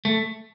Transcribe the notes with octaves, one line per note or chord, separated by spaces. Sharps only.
A3